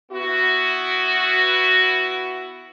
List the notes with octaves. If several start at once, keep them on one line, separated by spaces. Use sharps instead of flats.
B3 E4 F#4